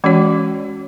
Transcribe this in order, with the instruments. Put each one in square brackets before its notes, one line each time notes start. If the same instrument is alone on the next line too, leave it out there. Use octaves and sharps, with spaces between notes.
[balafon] E3 G#3 C#4 F#4 C#5